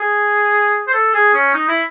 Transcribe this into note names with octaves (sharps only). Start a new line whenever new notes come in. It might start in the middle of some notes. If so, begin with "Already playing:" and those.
Already playing: G#4
C5
A4
G#4
C#4
D#4
E4